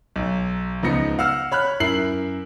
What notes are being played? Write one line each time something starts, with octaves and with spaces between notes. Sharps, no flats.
B1
C#2 F3 B3 D#4 A#6 C#7
F5 F#5 E6 F6
C#5 B5 F6 F#6
F#2 E4 A#4 C7 F#7